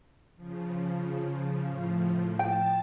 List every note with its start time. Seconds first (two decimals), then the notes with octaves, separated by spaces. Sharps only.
0.36 C#3 F3
1.69 A2 F3
2.39 G5 A5